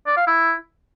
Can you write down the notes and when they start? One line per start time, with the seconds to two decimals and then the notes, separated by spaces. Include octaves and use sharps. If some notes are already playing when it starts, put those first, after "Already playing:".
0.06 D5
0.17 F5
0.27 E4